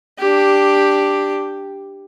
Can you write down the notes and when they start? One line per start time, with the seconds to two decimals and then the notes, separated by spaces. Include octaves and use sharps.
0.19 D4 G4